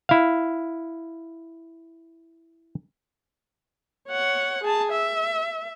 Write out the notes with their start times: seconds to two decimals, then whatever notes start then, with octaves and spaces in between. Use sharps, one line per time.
0.09 E4 F5
4.09 C#5 F#5
4.64 G#4 A5
4.92 E5